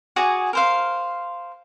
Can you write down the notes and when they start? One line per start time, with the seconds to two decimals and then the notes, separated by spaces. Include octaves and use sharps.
0.16 F#4 G#4 D5 G#5
0.53 A#4 C5 F5